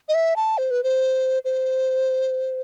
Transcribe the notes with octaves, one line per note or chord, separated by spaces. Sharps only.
D#5
E5
A5
C5
B4
C5
C5